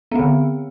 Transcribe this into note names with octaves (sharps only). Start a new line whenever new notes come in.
D3 B3 C4